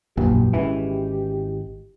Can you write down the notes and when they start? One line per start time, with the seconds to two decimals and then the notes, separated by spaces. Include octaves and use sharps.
0.17 E1 A#1 F#2 E3 G4
0.53 G#1 E3 G#3 C#4